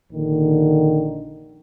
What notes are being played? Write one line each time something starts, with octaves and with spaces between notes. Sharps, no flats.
A#1 D3 D#3